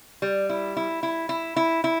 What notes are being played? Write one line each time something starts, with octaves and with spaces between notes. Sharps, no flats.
G3
E4
E4
E4
E4
E4
E4